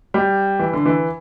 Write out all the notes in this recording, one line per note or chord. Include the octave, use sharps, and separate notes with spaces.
G3
E3
D3
E3